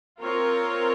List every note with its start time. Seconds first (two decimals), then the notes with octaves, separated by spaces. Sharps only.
0.22 C4 F4 A#4 C#5